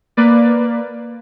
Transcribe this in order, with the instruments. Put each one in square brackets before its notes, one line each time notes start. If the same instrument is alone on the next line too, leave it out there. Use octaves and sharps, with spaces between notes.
[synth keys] A#3 B4 D5